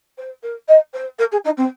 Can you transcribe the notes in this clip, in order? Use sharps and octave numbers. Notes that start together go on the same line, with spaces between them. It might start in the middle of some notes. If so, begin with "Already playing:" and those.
C5
A#4
D#5
C5
A#4
G#4
D#4
C4